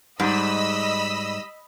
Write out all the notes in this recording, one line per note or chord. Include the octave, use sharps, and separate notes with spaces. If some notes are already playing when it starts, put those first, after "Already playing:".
G#2 G3 D#5 B5 E6